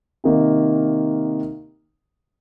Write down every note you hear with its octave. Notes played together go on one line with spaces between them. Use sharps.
C3 D#3 A#3 D#4